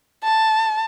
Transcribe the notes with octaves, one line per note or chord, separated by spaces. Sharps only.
A5